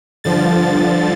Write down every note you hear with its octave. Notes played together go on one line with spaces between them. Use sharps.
G2 D3 F3 A6